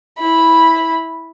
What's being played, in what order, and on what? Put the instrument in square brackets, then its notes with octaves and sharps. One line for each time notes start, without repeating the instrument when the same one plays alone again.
[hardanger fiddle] E4 B5